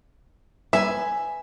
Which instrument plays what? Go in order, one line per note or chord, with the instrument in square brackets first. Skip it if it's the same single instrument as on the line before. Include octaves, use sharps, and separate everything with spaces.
[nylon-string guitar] B4 G#5 [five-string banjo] E5